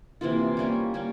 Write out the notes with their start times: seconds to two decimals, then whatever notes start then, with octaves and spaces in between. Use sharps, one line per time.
0.21 C3 E3 A#3 F4
0.57 G3 A#3 C#4
0.94 G3 A#3 C#4